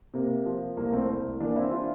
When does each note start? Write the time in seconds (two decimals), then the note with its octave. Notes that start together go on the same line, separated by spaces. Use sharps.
0.14 C3 A#3
0.46 F3
0.77 C2 A#3
0.92 A3 C4
1.09 C2
1.40 E3 A#3 D4
1.56 C4 E4
1.71 D4 F4